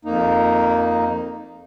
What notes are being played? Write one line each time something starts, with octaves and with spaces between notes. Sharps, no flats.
F2 A#3 D#4